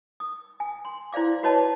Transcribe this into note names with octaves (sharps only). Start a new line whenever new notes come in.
D#6
G#5
C6
E4 C5 D5 F5 D6
F#4 B4 C#5 D#5 A5